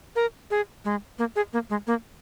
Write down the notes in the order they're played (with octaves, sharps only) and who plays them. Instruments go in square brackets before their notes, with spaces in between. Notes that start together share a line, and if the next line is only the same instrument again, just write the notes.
[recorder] A#4
G#4
G#3
A#3
G#4
A#3
G#3
A#3